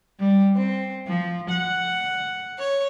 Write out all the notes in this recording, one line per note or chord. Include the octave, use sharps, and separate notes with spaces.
G3
C4
F3
F#5
C#5